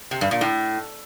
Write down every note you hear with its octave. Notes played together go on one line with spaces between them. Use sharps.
C3
G2
A#2
A2